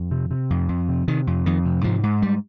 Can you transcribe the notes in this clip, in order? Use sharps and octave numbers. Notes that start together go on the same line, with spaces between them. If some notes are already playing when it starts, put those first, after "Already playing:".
Already playing: F2
C3
C3
F2
F2
C3
C3 D#3
F2
F2 D#3
C3
G#2 F3
G#2
G#2 G3